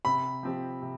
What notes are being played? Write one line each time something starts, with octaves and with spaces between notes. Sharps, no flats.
C3 B5
F3 C4 G4
C3